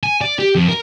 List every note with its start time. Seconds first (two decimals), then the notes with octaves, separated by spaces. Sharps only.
0.03 G#5
0.21 D5
0.39 G4
0.55 F2
0.69 A#4